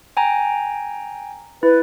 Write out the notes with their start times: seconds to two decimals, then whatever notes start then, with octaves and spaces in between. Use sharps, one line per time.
0.17 G5 G#5 A#5
1.63 E4 B4